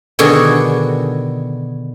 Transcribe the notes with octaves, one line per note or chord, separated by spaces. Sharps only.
B2 D3 D#3 F#4 G#4